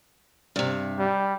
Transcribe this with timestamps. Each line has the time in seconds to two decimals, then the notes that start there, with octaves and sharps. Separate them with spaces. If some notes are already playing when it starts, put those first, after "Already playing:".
0.56 G2 C3
0.99 G3